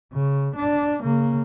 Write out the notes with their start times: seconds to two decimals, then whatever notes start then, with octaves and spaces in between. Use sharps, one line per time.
0.13 C#3
0.56 D4
1.01 C#3 A#3